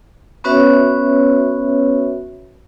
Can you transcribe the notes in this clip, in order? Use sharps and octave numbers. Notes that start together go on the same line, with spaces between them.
B3 C#4 F#4 B4 C#5 E5